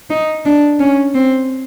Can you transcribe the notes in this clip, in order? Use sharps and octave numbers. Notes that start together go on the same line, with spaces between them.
D#4
D4
C#4
C4